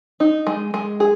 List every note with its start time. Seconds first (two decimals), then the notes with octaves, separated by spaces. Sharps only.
0.20 D#4
0.47 G#3
0.74 G#3
1.00 G#4